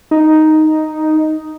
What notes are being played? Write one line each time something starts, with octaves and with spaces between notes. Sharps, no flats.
D#4